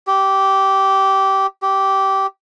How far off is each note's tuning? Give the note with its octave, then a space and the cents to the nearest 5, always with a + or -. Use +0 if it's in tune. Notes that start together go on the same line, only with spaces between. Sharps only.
G4 -15
G4 -15